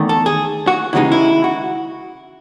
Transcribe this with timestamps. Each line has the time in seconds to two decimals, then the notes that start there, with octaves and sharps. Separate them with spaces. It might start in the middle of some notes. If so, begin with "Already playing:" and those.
Already playing: E2 D#3 A3
0.09 A4
0.26 G#4
0.67 F#4
0.93 D#2 C#3 E3 G#3 D#4 E4
1.12 E4
1.44 F#4